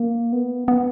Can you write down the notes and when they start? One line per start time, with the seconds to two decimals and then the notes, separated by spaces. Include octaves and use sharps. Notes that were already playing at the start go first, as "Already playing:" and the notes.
Already playing: A#3
0.33 B3
0.68 B3